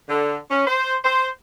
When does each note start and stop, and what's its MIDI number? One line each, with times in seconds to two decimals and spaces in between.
0.09 0.37 50
0.51 0.66 61
0.67 0.95 72
1.04 1.28 72